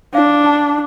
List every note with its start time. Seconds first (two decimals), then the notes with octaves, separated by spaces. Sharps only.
0.14 D4 F5
0.46 A5